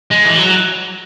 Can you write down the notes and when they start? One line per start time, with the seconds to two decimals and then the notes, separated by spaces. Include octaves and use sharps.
0.11 G#3
0.25 E3
0.36 F#3